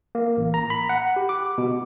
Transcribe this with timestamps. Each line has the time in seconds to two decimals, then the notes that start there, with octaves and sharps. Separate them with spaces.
0.15 A#3
0.37 A1
0.54 A#5
0.70 B5
0.89 F#5
1.16 G4
1.29 D6
1.58 B2